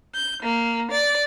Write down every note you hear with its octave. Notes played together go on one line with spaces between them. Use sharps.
G6
A#3
D5